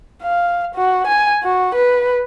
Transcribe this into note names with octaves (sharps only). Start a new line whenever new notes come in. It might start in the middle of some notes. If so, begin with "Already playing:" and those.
F5
F#4
G#5
F#4
B4